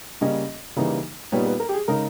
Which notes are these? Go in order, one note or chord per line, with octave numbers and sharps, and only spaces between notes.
C#3 G3 A#3 C#4 D#5
C#3 E3 G3 A#3 D#4
A#2 G3 B3 D#4 C#5
B4
A#4
G4
G#4
C#3 G#3 D#4 A#4